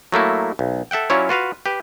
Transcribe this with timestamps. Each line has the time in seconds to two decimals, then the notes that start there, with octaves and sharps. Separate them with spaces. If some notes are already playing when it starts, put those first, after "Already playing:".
0.12 F#3 A3 A#3 E4
0.59 B1
0.91 A4 E5 F#5 G5
1.10 F#3 C#4 E4 F4 C#5 D5
1.29 F4 F#4 B4 F5
1.66 G4 B4